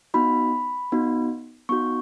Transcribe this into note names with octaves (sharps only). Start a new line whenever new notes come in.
B3 D#4 F#4 B5
B3 D#4 F#4
B3 D#4 F#4 C#6